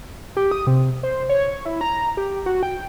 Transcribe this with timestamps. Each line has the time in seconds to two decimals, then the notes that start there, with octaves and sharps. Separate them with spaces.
0.37 G4
0.52 D#6
0.67 C3
1.03 C5
1.29 C#5
1.65 E4
1.81 A#5
2.17 G4
2.46 F#4
2.63 G5